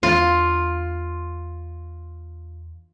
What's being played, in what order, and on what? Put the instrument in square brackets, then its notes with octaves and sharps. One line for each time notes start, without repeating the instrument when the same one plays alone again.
[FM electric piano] E2 [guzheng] F4